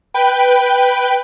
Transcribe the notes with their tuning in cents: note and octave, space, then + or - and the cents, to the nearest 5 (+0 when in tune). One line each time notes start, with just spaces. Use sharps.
B4 +0 G5 +0